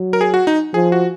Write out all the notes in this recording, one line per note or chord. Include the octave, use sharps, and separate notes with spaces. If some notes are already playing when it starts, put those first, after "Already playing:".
Already playing: F#3
A#4
G#4
F#4
D#4
F3 G#4
F#4